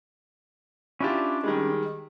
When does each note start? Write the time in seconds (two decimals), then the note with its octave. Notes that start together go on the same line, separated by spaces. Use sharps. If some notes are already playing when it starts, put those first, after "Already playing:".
1.00 C#4 D4 E4 F4 G4 A5
1.44 D#3 G3 G#3